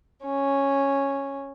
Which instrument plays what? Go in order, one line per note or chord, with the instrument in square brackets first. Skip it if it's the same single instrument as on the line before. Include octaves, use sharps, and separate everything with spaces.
[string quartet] C#4